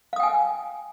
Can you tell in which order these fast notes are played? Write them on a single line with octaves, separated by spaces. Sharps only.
F5 D#6 G5 G#5